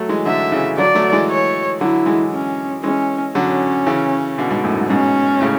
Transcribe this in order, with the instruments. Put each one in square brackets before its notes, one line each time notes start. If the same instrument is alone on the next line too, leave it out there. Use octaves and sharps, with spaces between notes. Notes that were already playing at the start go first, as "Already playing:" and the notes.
Already playing: [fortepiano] F#3 A3
E3 G#3
[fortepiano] D3 F#3 [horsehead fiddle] E5
[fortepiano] C#3 E3
[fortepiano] D3 F#3 [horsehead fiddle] D5
[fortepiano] F#3 A3
E3 G#3
[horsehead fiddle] C#5
[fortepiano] D3 F#3 [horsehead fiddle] E4
[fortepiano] E3 G#3
[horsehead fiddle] C#4
[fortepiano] E3 G#3 [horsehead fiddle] C#4
[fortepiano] D3 F#3 [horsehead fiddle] C#4
[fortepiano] C#3 E3
B2 D3
G#2 B2
F#2 A2
G#2
[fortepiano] G#2 B2 [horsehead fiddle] C#4
[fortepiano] A2 C#3